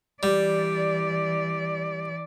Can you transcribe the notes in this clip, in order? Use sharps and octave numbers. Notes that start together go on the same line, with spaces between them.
E3 G3 D5